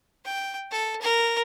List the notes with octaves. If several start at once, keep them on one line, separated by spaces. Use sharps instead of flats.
G5
A4
A#4